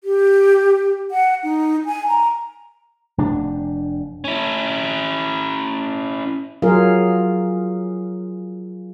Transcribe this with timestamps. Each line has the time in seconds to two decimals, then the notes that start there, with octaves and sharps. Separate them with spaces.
0.04 G4
1.11 F#5
1.44 D#4
1.86 G#5
2.07 A#5
3.18 F1 D4
4.24 C#4 E4
6.62 F#3 F4 G#4 A#4 F5